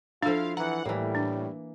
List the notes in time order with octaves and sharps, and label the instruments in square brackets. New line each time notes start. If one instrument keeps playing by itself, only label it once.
[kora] F3 E4 [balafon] D4 A4 [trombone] F4 [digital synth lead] F5
[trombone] E3 [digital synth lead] F#5 [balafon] A#5
[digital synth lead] A2 [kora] E3 A#3 [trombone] G3
[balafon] D4